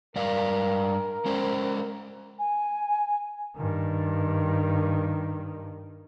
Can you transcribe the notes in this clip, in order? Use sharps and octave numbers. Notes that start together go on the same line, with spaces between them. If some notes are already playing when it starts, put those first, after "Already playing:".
G2 A#4 D5 F5
G#3 C#4 C5
G#5
G2 D#3